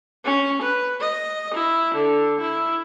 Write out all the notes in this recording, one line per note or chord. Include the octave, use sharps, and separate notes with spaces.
C#4
B4
D#5
E4
D3
E4